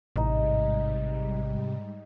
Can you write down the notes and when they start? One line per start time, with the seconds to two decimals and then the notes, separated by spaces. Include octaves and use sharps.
0.16 A1 G#2 C3 G3 D#4 D#5 E5